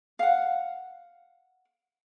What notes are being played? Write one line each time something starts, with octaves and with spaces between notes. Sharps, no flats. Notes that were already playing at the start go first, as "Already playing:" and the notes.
F5 F#5